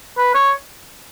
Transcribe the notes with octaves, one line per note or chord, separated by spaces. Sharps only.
B4
C#5